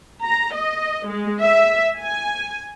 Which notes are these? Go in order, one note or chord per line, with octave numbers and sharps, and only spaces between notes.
A#5
D#5
G#3
E5
G#5